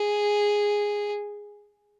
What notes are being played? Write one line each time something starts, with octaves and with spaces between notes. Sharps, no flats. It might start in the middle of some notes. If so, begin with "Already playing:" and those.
Already playing: G#4